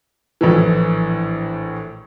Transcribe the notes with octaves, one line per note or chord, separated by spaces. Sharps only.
A#1 A2 E3